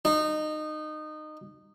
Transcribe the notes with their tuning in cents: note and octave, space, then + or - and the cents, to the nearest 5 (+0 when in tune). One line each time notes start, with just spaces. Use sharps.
D#4 -20